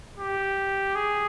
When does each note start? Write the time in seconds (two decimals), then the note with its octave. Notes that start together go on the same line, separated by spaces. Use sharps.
0.18 G4
0.95 G#4